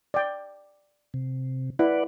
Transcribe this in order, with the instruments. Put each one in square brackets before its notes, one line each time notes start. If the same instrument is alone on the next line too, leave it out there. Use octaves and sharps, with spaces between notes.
[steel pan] D5 G5
[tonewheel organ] C3
[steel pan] E4 [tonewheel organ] B4 D5 F#5